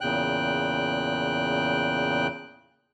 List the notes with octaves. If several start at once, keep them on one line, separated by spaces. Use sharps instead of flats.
E2 A#2 C#3 G5 F#6